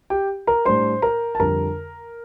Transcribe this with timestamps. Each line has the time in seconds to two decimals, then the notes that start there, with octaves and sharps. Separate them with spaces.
0.10 G4 G5
0.47 A#4 A#5
0.65 A2 G3 D4 C5 C6
1.02 A#4 A#5
1.35 A5
1.40 F2 D3 G3 A#4 A#5